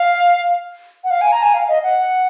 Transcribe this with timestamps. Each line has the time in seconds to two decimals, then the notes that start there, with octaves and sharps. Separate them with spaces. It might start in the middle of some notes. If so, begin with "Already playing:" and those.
Already playing: F5
1.04 F#5
1.11 F5
1.21 G#5
1.32 A#5
1.43 G#5
1.54 F5
1.69 D#5
1.83 F#5